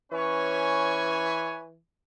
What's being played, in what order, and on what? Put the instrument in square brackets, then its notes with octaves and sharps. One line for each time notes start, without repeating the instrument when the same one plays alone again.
[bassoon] E3 [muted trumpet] C#4 [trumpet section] B4 C#5 G#5